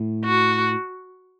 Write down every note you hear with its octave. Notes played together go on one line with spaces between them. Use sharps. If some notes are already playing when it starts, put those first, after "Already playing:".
Already playing: A2
F#4